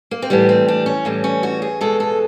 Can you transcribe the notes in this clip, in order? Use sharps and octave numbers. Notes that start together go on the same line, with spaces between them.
A#3
C4
A2 E3 G3 B3
C4
D4
C#4
A2 E3 G3
C#4
F#4
G#4
B2 G#3 A4
A4